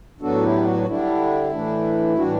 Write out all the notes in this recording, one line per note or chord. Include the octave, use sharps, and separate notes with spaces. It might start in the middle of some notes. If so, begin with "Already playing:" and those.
A2 F#3 B3 D4 F#4 A4
E4 G4
F#4
D3 G3 D4 E4
A2 E3 A3 D4
A2 E3 G3 D4 F#4